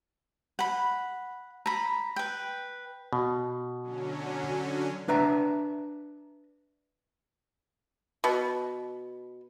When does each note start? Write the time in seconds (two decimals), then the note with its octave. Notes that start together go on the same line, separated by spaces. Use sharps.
0.59 F#5 B5
1.66 A#5 B5
2.16 B4 G5
3.13 B2
3.82 D3 F#3 C#4
5.08 D4 B4 E5 A#5
8.24 B2